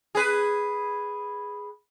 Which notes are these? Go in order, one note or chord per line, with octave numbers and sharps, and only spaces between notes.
G#4 B4